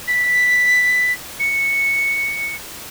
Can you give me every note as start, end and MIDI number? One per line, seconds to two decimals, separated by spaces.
0.08 1.12 95
1.40 2.55 97